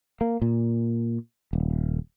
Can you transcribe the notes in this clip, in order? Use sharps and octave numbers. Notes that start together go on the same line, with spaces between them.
A#3
A#2
D#1